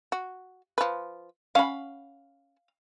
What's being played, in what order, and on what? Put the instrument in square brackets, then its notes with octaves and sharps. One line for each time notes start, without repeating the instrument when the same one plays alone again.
[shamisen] F#4
F3 B4
[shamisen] C#4 F#5 [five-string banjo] F5 B5